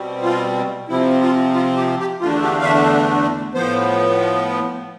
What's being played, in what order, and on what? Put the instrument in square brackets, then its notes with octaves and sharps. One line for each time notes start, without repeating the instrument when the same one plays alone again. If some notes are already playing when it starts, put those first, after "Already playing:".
Already playing: [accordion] B2 G3 C4
F4
C3 F3 C4 E4
F4
F4
G4
G4
E2 D3 A3 D4 F4
G4
F5
E5
A2 F3 B3 C5